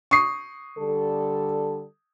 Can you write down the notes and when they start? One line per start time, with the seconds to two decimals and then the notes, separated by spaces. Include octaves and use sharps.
0.11 C#6 D#6 C7
0.79 D3 G3 A4